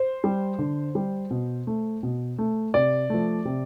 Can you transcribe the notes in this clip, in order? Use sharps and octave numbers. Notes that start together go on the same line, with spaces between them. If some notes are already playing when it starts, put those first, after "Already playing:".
Already playing: C5
G3
D3
G3
B2
A3
B2
A3
C3 D5
F3 A3
C3